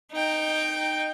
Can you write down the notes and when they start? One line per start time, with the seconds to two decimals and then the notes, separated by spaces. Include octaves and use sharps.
0.11 D#4 G5